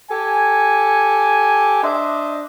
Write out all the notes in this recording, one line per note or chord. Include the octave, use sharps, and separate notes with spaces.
G4 A4 G#5
D4 C5 D#5 E5